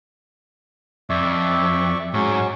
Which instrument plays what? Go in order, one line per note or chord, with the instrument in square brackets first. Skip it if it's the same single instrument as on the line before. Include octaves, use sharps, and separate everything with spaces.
[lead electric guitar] F2 [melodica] D5 E5 C#6
[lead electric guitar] G#2 [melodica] F#3 C#4 C#6